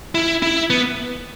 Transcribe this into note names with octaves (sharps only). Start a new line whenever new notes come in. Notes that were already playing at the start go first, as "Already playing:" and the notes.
E4
E4
B3